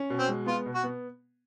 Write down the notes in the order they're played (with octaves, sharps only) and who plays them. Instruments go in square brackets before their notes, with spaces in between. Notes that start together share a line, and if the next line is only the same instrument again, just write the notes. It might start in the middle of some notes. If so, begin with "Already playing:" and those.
Already playing: [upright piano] C#4
B2
[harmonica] C4
[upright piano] G#3
[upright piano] B3 [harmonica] F4
[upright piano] B2
[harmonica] F#4
[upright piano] B3